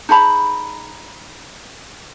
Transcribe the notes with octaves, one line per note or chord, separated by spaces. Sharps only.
D#4 G#4 A5 B5